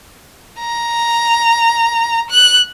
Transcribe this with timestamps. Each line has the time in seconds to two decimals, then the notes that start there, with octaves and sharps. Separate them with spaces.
0.59 A#5
2.30 F#6